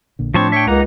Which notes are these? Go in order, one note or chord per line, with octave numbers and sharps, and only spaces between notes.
A#1 A#2 D3
A2 F3 C4 D4 C#5 A5 C#6
C#5 E5 G5 C#6
C#2 A#3 D#4 F#5 A#5